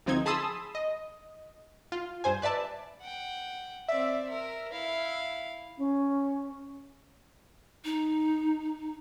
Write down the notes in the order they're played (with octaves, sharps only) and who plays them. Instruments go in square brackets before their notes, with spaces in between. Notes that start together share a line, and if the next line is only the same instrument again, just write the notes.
[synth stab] D2 F3 C4 D#4 G#6
G#4 A5 B5 C6 D#6 E6
D#5
F4
G2 C5 G#5
B4 D5 E5 A5
[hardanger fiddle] F#5 G5
[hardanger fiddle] C4 D5 [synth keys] E5
[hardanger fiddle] A#4
E4 F5
[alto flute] C#4
[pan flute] D#4